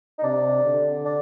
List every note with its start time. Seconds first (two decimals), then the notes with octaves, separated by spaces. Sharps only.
0.19 D#4
0.23 C3 D4
0.64 D3
1.05 D4